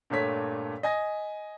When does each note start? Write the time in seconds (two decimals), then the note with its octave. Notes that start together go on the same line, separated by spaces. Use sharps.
0.10 G2 A#2 A3 C#5 B6
0.83 D#5 G#5 A#6